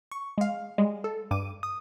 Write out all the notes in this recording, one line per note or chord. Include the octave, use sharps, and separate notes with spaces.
C#6
G#3 F5
G3 G#3
A4
G2 D6 D#7
D#6